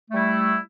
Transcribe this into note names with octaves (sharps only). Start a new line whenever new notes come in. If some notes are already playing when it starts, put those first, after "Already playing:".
G3 A3 E4